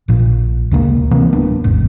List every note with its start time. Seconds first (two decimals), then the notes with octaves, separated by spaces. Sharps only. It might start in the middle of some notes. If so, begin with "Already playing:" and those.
0.08 A#1 A#2
0.71 D2 C#3 G#3 A#3
1.11 C3 E3 A#3 C4
1.33 D1 A#3 B3 D4
1.64 G#1 E2 G#2